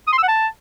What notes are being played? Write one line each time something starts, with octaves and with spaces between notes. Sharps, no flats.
D#6
C6
E6
F#5
A5